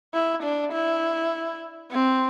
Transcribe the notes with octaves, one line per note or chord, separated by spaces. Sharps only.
E4
D4
E4
C4